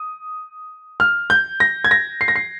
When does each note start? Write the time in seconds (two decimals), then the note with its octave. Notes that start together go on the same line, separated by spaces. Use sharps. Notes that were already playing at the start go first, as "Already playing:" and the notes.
Already playing: D#6
1.00 F6
1.30 G6
1.60 A#6
1.85 G#6
1.91 A#6
2.21 C7
2.28 A#6
2.36 C7